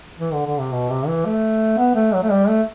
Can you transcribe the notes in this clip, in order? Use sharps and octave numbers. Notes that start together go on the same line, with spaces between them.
E3
D3
D3
C3
B2
C3
E3
A3
B3
A3
F#3
A3
G3
A3